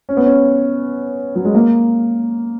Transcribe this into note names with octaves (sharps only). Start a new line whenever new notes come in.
C#4
B3
C#4
F#3
G#3
A#3